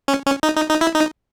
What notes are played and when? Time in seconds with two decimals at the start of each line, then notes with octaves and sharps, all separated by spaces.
0.08 C#4
0.26 C#4
0.43 D#4
0.56 D#4
0.69 D#4
0.81 E4
0.95 D#4